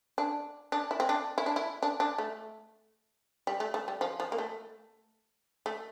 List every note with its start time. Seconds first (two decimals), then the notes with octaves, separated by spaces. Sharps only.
0.18 D4
0.72 D4
0.91 E4
1.00 C4
1.09 D4
1.38 E4
1.46 D4
1.56 E4
1.83 D4
2.00 D4
2.18 A3
3.47 G3
3.60 A3
3.74 A3
3.88 G3
4.01 F3
4.20 F3
4.32 A#3
4.38 A3
5.66 A3